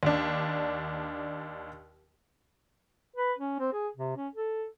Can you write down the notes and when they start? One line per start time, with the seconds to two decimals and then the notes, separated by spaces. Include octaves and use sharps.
0.03 D#2 D4
3.16 B4
3.38 C#4
3.59 C4
3.73 G#4
3.97 C3
4.17 C#4
4.35 A4